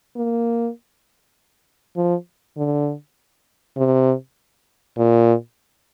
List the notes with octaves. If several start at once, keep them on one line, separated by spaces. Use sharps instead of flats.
A#3
F3
D3
C3
A#2